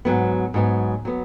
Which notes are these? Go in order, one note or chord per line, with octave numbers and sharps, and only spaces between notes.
G#2 F#3 B3
G#2 F#3 B3
F#3 B3